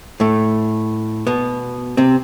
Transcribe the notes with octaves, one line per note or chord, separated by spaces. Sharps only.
A2 A3
B2 B3
C3 C4